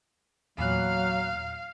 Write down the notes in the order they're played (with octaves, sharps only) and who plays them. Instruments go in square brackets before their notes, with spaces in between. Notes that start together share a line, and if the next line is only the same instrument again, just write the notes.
[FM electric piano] E2 A#2 F#6 [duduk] F#3 [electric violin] F5